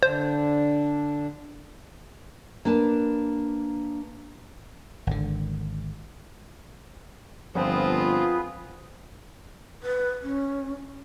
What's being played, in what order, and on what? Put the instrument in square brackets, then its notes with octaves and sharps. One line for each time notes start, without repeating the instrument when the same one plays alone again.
[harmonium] D3 D4 [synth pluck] C5
[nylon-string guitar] A#3 D4 B4 A5
[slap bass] G#1 D3
[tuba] G1 [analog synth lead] F3 [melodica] B3 G#4 B4 [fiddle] C4 F4
[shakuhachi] B4
C#4